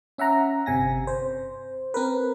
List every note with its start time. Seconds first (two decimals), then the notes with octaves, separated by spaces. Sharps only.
0.18 C#4 E5 F#5 A#5
0.66 G1 C3 G#5 A#6
1.07 C5
1.94 C4 A#4 B4